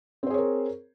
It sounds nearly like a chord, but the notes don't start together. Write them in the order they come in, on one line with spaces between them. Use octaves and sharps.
C4 C5 G#4 C#5 A#4